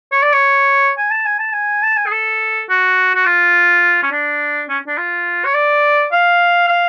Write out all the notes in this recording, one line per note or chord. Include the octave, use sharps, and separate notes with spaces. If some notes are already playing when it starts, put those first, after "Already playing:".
C#5
D5
C#5
G#5
A5
G#5
A5
G#5
A5
G#5
G#4
A4
F#4
F#4
F4
C#4
D4
C#4
D4
F4
C#5
D5
F5
F5